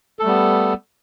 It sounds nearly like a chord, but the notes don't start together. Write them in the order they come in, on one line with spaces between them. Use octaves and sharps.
A4 A3 G3 B3